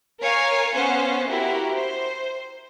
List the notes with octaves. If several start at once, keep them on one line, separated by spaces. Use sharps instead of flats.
A#4 C#5 F5 G#5
B3 C#4 C5 F5 F#5
E4 F#4 G4 A#4
C5